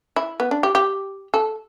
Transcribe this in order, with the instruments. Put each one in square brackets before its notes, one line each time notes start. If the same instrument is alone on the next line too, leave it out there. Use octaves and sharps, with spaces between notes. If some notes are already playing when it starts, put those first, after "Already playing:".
[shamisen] E4
B3
D4
G4
G4
A4